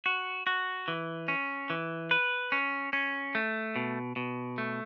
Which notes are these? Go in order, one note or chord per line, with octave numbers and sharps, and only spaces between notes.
F#4
F#4
E3
C#4
E3
B4
C#4
C#4
A3
B2
B2
A3